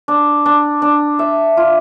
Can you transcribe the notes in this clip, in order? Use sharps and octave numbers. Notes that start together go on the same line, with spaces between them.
D4
D4
D4
E5
F4